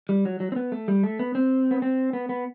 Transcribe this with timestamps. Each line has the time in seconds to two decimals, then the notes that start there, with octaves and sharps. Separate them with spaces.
0.09 G3
0.25 F#3
0.40 F#3
0.52 C4
0.56 B3
0.72 A3
0.88 G3
1.03 A3
1.19 B3
1.35 C4
1.71 B3
1.82 C4
2.13 B3
2.29 B3